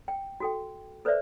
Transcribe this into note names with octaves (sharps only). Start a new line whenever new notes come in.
G5
F#4 A4 G5
A4 B4 C5 D5 E5